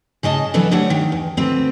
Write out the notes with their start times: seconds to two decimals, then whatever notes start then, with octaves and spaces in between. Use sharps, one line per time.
0.23 C#3 G#4 D#5 A5
0.54 E3 F#3 B3 D4 A4 B4
0.71 D2 G3 A3 D4 C#5 F#5
0.90 D#3
1.12 E2
1.37 D2 C4 B4